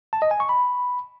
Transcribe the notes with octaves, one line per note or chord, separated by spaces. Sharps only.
A5
D#5
G#5
C#6
B5